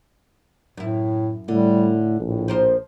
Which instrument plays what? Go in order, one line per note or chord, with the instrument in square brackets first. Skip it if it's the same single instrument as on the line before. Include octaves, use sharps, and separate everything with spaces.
[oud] F#2 E4 [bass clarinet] A2
[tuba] A2 [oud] D3 [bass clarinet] G3
[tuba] A#1 [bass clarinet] A2
[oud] F3 A#4 C5